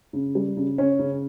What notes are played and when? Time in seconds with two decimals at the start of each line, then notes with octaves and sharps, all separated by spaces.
0.13 C#3
0.35 G3
0.57 C#3
0.78 C#4
0.99 C#3